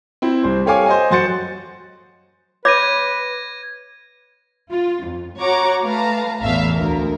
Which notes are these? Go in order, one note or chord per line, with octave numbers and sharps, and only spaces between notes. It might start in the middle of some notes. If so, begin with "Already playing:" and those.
C4 E4
C2 C5
G4 A4 C#5 F5 G#5 D6
C5 D#5 G#5
F#2 F#4 C5 A6 C#7
B4 C#5 B5 D6 G#6 A#6 D#7
F4
F2
F#4 C#5 F#5 A#5 D6
A3 B4 F5 A5 A#5
A1 E2 E3 A3 E5 F5
D2 A#4